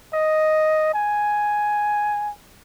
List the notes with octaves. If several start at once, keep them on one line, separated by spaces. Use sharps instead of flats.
D#5
G#5